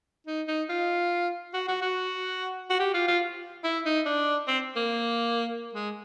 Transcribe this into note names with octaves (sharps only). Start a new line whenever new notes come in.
D#4
D#4
F4
F#4
F#4
F#4
F#4
G4
F4
F4
E4
D#4
D4
C4
A#3
G#3